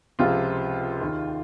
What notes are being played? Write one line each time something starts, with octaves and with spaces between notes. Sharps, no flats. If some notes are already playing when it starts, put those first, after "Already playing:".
C#2 C3 F3 F4
D#2 D#3